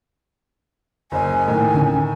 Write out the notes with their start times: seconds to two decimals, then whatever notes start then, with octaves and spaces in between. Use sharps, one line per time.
1.12 F#1 C5 D#5 G#5
1.48 A2 D#3
1.74 D3 C#4